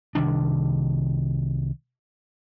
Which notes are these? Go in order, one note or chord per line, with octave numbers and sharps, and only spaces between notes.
C2 D#3 D4